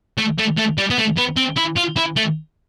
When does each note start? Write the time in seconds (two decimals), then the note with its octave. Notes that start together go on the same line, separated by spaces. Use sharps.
0.18 A3
0.39 A3
0.58 A3
0.78 G3
0.90 B3
0.98 A3
1.17 B3
1.36 C4
1.56 E4
1.76 F4
1.96 E4
2.16 A3